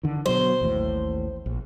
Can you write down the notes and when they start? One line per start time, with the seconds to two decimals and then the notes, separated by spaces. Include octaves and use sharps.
0.03 D3 D#3
0.26 B2 F#3 C5
0.61 A1 D#2 A2
1.46 A#1